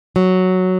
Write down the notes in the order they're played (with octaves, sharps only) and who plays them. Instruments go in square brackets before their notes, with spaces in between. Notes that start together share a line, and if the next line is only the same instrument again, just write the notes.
[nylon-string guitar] F#3